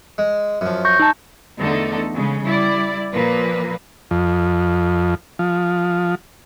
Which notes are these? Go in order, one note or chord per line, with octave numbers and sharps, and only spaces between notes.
G#3
F#2 F3
C#6 G6 A#6
D#4 A5
E2 D3 A3 D#4 A4
C#3 G#3
G3 E4 D5
A#2 F3 A#3 B4
F2
F3